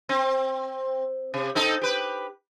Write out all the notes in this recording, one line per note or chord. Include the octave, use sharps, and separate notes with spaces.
C4
C3
C4 D#4 A4
G4 B4